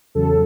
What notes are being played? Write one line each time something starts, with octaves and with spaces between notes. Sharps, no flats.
E2 C#3 F#3 A4